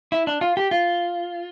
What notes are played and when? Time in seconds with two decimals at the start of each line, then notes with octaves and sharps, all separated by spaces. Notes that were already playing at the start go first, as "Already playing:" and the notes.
0.12 E4
0.27 D4
0.41 F4
0.57 G4
0.71 F4